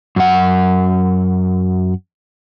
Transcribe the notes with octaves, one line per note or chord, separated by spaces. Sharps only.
F#2 F#5